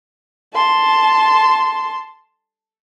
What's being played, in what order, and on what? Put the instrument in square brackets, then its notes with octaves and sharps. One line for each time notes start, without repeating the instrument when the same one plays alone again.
[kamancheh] A5 C6